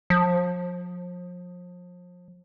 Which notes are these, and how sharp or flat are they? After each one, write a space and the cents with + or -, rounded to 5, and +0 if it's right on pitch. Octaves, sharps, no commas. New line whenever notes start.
F3 +35